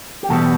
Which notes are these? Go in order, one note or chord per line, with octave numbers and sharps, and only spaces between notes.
G4
E2 B2 G3 B3 F#4 A4